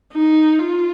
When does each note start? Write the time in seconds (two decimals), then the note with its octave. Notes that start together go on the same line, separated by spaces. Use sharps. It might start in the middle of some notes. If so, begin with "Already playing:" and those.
0.14 D#4
0.59 F4